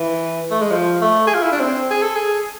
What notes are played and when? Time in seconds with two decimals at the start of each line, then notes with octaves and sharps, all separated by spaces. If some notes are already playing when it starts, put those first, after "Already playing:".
Already playing: E3
0.51 A3
0.61 G#3
0.72 F3
1.02 A3
1.27 G#4
1.35 F4
1.43 E4
1.52 D4
1.60 C4
1.91 G#4
2.02 A4
2.16 G#4